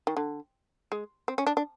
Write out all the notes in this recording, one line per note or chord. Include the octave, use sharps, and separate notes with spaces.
D#3
D3
G#3
C4
C#4
D4
D4